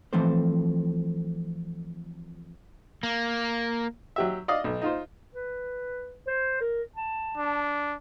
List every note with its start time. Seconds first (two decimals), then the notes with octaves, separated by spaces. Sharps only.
0.13 E3 F3 A3 C4 A4 C5
3.03 A#3
4.16 F#3 G4 E5
4.48 D5 D#5 F5 D#6
4.64 B1
4.82 D#4 F4 C5
5.35 B4
6.28 C5
6.61 A#4
6.96 A5
7.38 D4